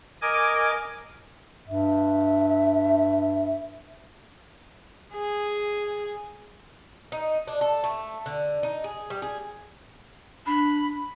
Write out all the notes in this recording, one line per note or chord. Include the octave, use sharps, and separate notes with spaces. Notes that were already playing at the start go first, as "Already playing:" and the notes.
A#4 D#5 G#5 D6
G2 E5
G#4
D#4
D4
A4
A3
D3
D#4
G#4
G3
G#4
D4 B5